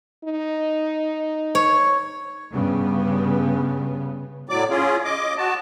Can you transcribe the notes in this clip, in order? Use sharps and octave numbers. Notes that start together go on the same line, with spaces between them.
D#4
C#5
G2 C#3 B3
A2 F#3 D5 D6
C#4 F4 G#4
D#5 D6
F#4 A5